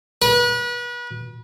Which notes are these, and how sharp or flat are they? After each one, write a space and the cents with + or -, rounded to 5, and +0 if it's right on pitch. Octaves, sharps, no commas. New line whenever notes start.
B4 -35